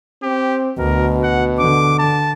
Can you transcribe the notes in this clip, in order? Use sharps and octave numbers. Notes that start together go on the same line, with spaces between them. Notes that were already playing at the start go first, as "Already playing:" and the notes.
C4 G4
D2 B2 A#4
F#5
D3 D6
A5